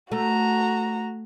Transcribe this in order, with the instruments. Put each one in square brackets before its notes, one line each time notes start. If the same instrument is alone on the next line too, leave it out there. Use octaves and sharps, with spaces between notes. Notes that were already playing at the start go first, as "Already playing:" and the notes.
[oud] A3 [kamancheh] F#4 A#5